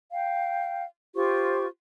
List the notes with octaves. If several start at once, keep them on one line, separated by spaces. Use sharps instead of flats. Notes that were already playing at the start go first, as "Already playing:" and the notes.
F5 G5
F4 G4 C5 C#6